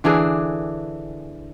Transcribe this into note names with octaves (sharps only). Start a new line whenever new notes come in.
D3 E3 D4 G#4